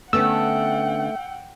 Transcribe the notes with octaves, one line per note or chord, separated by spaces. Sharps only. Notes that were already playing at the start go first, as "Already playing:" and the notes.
D3 A3 B3 C#4 F#5 G5 E6